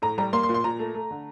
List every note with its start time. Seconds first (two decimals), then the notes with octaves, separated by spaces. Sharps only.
0.02 A2 A#5
0.18 G3 A#5
0.33 A#3 C6
0.43 C6
0.49 A#2
0.54 C6
0.64 A#2 A#5
0.79 A3
0.94 A3
1.11 D3